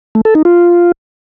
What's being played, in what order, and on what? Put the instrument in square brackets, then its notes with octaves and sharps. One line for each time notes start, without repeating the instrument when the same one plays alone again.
[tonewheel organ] A3
A4
D#4
F4